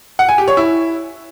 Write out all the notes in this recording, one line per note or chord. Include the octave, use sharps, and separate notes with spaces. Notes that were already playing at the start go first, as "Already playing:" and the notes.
F#5
G#5
G4
C#5
E4